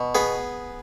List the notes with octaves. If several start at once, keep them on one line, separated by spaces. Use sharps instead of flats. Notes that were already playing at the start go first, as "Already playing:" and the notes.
Already playing: B2
B3 G#4